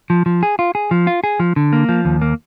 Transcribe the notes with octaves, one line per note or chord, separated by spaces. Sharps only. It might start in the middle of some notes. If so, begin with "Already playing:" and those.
F3
F3
G#4
F4
G#4
F3
F4
G#4
F3
D3
A#3
F3
D#2
A#3